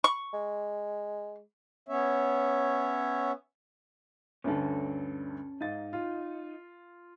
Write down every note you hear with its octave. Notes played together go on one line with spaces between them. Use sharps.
C#6
G#3
B3 C#4 C#5 E5
D2 G2 D3 C#4 A4
G#2 D#4 F5 A6
F4